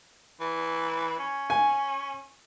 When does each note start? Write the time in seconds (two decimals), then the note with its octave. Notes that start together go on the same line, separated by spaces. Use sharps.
0.40 E3
1.19 C#4
1.50 G#5